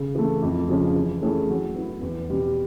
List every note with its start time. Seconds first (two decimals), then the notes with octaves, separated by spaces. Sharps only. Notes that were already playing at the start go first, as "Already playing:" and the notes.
Already playing: C#3
0.15 E3 A3
0.42 F2
0.69 C#3 F3 G#3 C#4
0.95 E3
1.22 A3 C#4 E4 G#4
1.49 F#3
1.75 B3 E4
2.02 E2
2.29 B2 G3